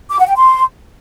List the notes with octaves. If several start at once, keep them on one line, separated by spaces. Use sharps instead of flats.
D6
F#5
G5
C6